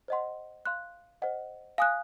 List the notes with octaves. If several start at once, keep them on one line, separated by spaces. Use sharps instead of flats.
C5 D#5 F#5 C6
F5 C6 F#6
C5 D#5 F#5
F5 G#5 D#6 F#6